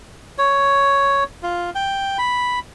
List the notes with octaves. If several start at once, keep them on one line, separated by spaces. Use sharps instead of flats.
C#5
F4
G5
B5